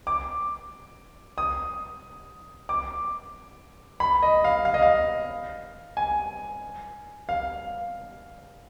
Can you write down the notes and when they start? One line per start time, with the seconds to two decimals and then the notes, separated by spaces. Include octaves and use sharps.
0.07 D6
1.38 D#6
2.69 D6
4.00 B5
4.22 D#5
4.44 F5
4.65 F5
4.74 D#5
4.82 F5
5.97 G#5
7.29 F5